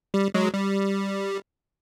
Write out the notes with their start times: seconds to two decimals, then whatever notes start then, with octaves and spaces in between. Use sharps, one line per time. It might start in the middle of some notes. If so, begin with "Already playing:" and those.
0.14 G3
0.34 F#3 G#3
0.54 G3